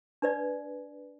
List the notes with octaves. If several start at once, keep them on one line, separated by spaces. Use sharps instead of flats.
D4 B4 D5